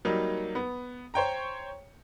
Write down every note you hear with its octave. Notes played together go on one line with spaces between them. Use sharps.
F#3 G3 A#3 D#4
B3
C5 C#5 G5 A#5